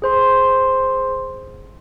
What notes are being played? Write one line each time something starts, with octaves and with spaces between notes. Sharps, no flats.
G#4 C5 C6